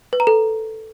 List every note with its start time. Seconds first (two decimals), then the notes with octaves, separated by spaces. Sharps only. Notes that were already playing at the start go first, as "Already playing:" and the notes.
0.13 B4
0.20 A#5
0.27 A4